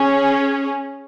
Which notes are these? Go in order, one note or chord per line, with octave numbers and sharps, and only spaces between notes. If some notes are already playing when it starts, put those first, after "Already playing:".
Already playing: C#4 G#4